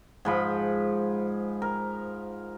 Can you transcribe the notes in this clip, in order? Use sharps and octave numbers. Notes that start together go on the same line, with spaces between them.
G#2 F3 B5
A#4